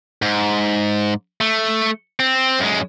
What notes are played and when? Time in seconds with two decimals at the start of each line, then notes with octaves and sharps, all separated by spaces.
0.22 G#2
1.41 A3
2.20 C4
2.59 F#2 G#3